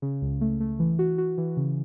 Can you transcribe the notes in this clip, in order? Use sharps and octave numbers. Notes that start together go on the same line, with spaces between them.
C#3
C#2
A3
A3
E3
F#4
F#4
E3
C#3